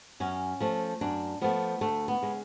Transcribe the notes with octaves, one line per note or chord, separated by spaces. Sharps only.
F#2 C#4
F3 A3
F#2 D4
F3 A3 B3
D2 A3
B3
C#3 G#3